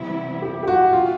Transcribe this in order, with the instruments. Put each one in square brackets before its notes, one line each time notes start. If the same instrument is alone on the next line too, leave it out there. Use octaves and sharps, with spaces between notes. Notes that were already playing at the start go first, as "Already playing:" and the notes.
Already playing: [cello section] C3 E3 G3 B3 E4
[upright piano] G4
G4
F#4
F4